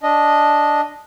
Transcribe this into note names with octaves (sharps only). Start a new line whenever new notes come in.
D4 D#5